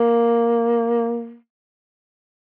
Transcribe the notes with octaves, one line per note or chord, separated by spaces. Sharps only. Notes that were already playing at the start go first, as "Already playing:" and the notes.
Already playing: A#3